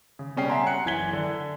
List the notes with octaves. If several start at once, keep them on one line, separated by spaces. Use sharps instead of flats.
C#3
B2 G3 C#4 G#4 G5 C7
C#5 E5 F#5 G#5 A#5 C6
F#6 C#7
F#1 E3 G#5 G#6 B6 G7
D3